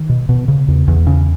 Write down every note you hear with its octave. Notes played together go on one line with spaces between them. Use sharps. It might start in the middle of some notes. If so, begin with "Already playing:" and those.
Already playing: D#3
B2
B2
C#3
E2
E2
C#3